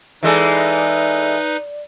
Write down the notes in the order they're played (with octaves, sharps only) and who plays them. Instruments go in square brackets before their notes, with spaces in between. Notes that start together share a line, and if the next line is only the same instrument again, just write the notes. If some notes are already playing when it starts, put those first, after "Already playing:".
[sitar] E3 G#3 A4 [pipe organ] D#4 B4 [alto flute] D5